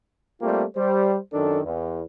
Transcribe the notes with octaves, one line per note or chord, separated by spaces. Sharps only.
G3 A3 A#3 C4 F4 G4
G3 C5
F#2 D#3 D4 A4
E2